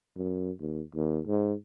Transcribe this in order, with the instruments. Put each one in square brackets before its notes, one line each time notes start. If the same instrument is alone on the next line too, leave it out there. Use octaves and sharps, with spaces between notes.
[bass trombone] F#2
D#2
D#2
G#2